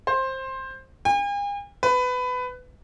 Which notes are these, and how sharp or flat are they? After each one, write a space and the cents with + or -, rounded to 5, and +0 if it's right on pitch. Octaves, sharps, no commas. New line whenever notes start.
C5 +15
G#5 -45
B4 +20